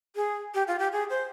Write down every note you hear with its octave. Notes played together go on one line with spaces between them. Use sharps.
G#4
G4
F4
G4
G#4
C5